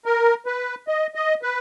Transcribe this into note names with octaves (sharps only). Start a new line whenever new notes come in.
A#4
B4
D#5
D#5
B4